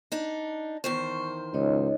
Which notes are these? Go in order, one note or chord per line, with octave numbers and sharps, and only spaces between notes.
D4 D#4
E2 D#3 C5 C#6
C#2 D#4 C#5 D#5